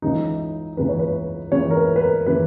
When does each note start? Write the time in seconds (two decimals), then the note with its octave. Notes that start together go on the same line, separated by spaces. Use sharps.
0.02 C#2 C#3 E3 D#4
0.77 C#2 C#3 E3 B4
0.89 C#5
0.99 B4
1.52 C#2 C#3 E3 C#5
1.71 A#4
1.77 B4
1.96 B4
2.02 A#4
2.27 C#3 E3 B4